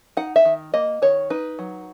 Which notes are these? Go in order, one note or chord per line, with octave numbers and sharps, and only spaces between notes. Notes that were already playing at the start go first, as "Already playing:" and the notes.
D#4 F#5
E5
D#3
A#3 D#5
D#3 C#5
D#4 B4
F#3